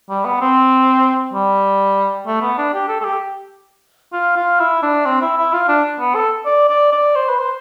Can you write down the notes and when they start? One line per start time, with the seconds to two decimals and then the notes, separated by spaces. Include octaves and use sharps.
0.10 G3
0.25 B3
0.41 C4
1.33 G3
2.27 A3
2.42 B3
2.58 D4
2.74 G4
2.88 A4
3.00 A4
3.05 G4
4.13 F4
4.36 F4
4.60 E4
4.83 D4
5.06 C4
5.22 E4
5.38 E4
5.53 F4
5.68 D4
6.00 B3
6.15 A4
6.45 D5
6.69 D5
6.92 D5
7.15 C5
7.29 B4
7.39 C5